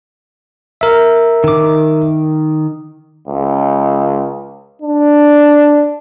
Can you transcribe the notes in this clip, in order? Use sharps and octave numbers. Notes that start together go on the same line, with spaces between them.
A#4 E5
D#3 D6
C#2
D4